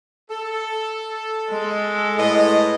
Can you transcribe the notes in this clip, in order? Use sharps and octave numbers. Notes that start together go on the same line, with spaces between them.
A4
G#3
A2 B4 D#5